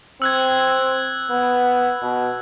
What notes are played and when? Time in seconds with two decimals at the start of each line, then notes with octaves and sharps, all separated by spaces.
0.22 C4 E6 F#6 G#6
1.30 B3
2.02 B2